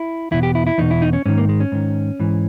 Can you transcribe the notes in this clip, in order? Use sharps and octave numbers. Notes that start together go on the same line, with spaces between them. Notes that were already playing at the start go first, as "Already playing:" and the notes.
Already playing: E4
E2 B2 E4
G4
E4
E4
E2 B2 D#4
E4
D#4
C#4
G#2 D#3 C#4
A#3
G#3
C#4
G#2 D#3
G#2 E3